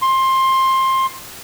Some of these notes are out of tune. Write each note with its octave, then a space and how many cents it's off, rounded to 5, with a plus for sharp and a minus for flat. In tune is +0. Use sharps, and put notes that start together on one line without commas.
C6 +15